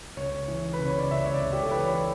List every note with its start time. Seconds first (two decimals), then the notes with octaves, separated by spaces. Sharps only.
0.17 C#2 C#5
0.48 E3
0.73 B4
0.79 C#3
0.86 C#5
0.98 D5
1.11 C#2 E5
1.26 C#5
1.34 D5
1.42 C#2
1.53 G4
1.62 A4
1.71 E3 B4
1.80 C#5